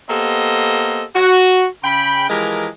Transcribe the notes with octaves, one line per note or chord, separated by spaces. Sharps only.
A#3 B3 G4 A4 C5 D#5
F#4
C#3 G5 B5
E3 F3 G#3 G4 A#4